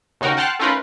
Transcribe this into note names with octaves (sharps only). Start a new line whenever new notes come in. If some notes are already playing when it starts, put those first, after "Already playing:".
D#2 C#3 D#4 F#4 A#4
F#5 G5 A5 C6 F6 F#6
A3 C#4 D#4 F4 A#4 B4